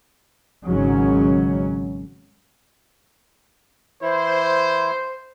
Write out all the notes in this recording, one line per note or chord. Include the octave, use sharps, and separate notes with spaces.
G#1 G#2 C#3 F#3 C#4
E3 E4 C5